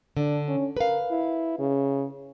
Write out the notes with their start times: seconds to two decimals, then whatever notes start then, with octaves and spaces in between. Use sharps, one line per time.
0.17 D3 D4
0.48 C#4
0.77 A#4 B4 F5
1.11 E4
1.59 C#3